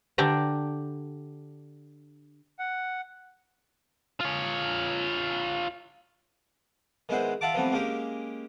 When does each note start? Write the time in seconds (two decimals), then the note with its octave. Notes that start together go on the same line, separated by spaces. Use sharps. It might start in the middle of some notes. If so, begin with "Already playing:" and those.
0.18 D3 D4 G4 D5 A#5
2.59 F#5
4.20 F4 C#5
7.09 D#3 G#3 B3 E4 F#4 C5
7.41 F4 E5 F#5 A5 D6
7.54 E3 F3 G3 A3 B3 C4
7.72 G#3 A#3 C#4 G4 A#4